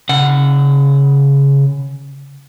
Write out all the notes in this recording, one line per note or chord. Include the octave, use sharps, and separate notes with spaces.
C#3 F#5